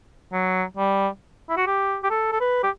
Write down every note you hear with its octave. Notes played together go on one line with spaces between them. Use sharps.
F#3
G3
E4
F#4
G4
G4
A4
A4
B4
G4